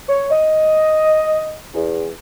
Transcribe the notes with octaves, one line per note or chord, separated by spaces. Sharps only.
C#5
D#5
E2